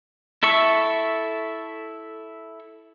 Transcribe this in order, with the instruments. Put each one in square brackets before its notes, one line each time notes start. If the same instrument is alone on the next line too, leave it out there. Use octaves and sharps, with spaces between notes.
[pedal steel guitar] E4 A4 E5 C#6